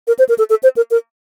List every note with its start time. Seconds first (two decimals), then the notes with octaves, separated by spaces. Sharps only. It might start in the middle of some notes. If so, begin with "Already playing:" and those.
0.07 A#4
0.19 C5
0.29 A#4
0.38 A4
0.50 A4
0.63 C5
0.77 A#4
0.91 A#4